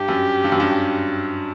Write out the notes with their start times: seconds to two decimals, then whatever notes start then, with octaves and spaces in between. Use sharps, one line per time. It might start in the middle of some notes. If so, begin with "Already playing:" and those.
Already playing: G2 G4
0.08 F#2
0.44 G2
0.52 F#2
0.60 G2